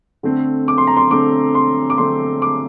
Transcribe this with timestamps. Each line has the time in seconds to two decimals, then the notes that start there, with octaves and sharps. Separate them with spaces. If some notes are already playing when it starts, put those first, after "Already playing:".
0.23 D3 A3 C4
0.68 D6
0.78 C6
0.87 A#5
0.97 C6
1.11 D3 A3 C4 D6
1.55 C6
1.90 D6
1.97 D3 A3 C4 C6
2.42 D6